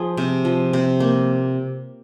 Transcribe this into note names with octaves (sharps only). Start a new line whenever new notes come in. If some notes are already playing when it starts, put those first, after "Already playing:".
Already playing: F3 G#4
C3
F3
C3
A#3